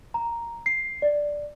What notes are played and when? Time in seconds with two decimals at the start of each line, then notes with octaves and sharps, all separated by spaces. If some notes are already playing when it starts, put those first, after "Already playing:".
0.14 A#5
0.66 C7
1.02 D5